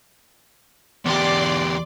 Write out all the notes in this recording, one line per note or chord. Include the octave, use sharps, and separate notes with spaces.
E2 G4 D5 C6 D6